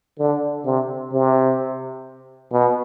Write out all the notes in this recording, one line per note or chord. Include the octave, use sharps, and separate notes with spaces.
D3
C3
C3
B2